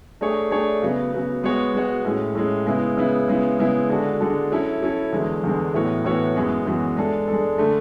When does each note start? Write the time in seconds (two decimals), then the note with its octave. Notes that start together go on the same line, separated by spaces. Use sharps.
0.21 A3 D4 G#4 C#5
0.51 A3 D4 G#4 C#5
0.82 C#3 F#3 B3
1.13 C#3 F#3 B3
1.44 G#3 B3 F#4 C#5
1.74 G#3 B3 F#4 C#5
2.05 A2 G#3 C#4
2.35 A2 G#3 C#4
2.66 C#3 G#3 B3 E4
2.97 C#3 G#3 B3 E4
3.28 C#3 G#3 B3 E4
3.59 C#3 G#3 B3 E4
3.90 D3 G#3 D4 F#4 A4
4.20 D3 G#3 D4 F#4 A4
4.52 F#3 C#4 E4 A4
4.81 F#3 C#4 E4 A4
5.13 E2 D3 G#3
5.44 E2 D3 G#3
5.74 A2 E3 B3 F#4 C#5
6.05 A2 E3 B3 F#4 C#5
6.35 F#2 E3 G#3 B3 F#4
6.66 F#2 E3 G#3 B3 F#4
6.97 G#3 D4 A4
7.28 G#3 D4 A4
7.58 D3 A3